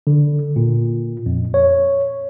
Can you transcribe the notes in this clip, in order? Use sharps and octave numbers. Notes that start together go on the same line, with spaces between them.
D3
A#2
F2
C#5